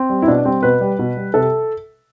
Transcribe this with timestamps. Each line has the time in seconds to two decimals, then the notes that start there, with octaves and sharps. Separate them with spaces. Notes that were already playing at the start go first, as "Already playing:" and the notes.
Already playing: C4
0.10 G3
0.22 E4
0.27 B2 D4
0.45 G3 C4
0.63 B2 B4
0.81 G3
0.99 B2
1.17 G3
1.34 C3 A4